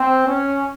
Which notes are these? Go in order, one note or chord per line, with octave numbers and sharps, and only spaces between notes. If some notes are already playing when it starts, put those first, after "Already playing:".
Already playing: C4
C#4